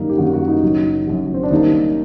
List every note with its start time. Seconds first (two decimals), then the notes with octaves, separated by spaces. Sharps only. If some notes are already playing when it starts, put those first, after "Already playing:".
Already playing: F#2 D#3 G3 A#3 D#4
0.09 G4
0.18 F#2 D#3 G3 A#3 F#4
0.34 F#4
0.48 D#4
0.62 F#1 F#2 F#3
1.07 F#1 F#2 F#3
1.34 C4
1.43 D4
1.50 D#2 D#3 G3 A#3 D#4